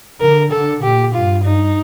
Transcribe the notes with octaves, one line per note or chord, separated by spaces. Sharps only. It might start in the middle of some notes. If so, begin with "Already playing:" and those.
D3 A#4
D3 A4
A#2 G4
G2 F4
D#4